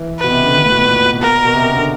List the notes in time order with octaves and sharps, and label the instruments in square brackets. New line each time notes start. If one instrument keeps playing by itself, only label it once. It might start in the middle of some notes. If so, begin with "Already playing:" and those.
Already playing: [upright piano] E3
[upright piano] B2 [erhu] B4
[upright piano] C3
C#3
D3
D#3
A2
B2
A#2
A#2
B2
[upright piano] B2 [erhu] A#4
[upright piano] B2
C3
C#3
D3